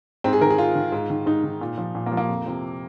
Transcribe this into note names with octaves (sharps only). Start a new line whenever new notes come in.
G#2 C4
G#4
D#3 A#4
G#4
G#2 F4
D#3
G#2
D#3
G#2 D#4
D#3
A#2
F3
A#2
A#3
F3
A#3
F2
C3 F3